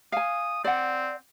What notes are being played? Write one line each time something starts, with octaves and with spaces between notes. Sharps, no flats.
F5 G#5 D#6
C4 D5 F#5